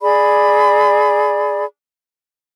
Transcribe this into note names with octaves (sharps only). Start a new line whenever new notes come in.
G#4 D5 B5